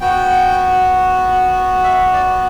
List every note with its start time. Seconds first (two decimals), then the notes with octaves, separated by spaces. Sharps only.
0.01 B3 F#4 G5
1.84 E5
2.13 D5